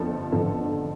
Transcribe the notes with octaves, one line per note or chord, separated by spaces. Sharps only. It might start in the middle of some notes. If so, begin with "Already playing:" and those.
Already playing: G1 F2 D3 F3 A4
G1 F2 D3 F3 A4